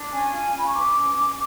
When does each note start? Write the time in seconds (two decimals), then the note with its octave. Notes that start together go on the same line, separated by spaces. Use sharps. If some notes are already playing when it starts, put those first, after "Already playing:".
Already playing: D4
0.11 C#4 G#5
0.31 F4
0.52 C#4
0.58 B5
0.65 C#6
0.73 B4 D6
0.94 C#4
1.15 C#4